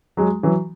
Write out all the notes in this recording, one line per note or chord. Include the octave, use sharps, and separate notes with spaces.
F#3 G#3
E3 F#3